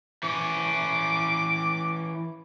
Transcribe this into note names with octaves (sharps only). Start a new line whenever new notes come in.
E3 C#4 D6